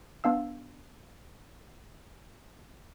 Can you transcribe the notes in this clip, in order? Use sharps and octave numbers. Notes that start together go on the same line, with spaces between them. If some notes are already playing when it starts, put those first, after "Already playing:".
B3 D4 F5 E6